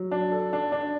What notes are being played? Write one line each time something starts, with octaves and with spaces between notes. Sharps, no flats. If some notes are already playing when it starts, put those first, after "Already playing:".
Already playing: F#3
D4
A4
D4
D4